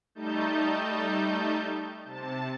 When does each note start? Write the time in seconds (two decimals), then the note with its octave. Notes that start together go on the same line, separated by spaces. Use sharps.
0.15 G3 A3 D#4 A5 G6
2.04 C3 A5